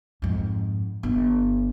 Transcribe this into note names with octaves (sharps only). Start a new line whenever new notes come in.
F2 G#2
G1